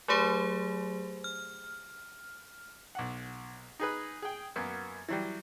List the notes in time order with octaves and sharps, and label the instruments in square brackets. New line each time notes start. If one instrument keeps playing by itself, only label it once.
[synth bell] F#3 A3 G4 G#4 C5
F6
[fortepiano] B1 F#5
D#4 G#4 B4
G#4 G5
F#2 A#3 B3
E3 F#3 G3